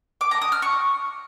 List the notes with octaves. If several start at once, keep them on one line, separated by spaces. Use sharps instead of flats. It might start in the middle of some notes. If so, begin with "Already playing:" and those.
D6
A#5
D#6
F6
C#6